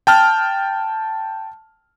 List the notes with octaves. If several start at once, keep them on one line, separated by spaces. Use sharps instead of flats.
G5 A5 F6